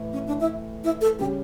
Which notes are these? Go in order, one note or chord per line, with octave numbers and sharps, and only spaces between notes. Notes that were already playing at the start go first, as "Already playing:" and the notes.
Already playing: A2 E3 A3 E4
C#4
D4
E4
E4
A4
C#3 G3 G4